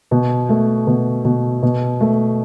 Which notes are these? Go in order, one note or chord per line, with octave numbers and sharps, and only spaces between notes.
B2
A3
B2
B2
B2
A3